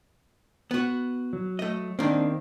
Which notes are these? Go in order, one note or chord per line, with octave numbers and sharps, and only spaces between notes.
B3 F#4
F#3
A3 D#5
D#3 A#3 C4 D4